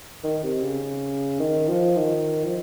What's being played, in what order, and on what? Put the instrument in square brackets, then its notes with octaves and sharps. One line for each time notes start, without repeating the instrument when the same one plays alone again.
[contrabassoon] D#3
C3
C#3
D#3
F3
D#3
F3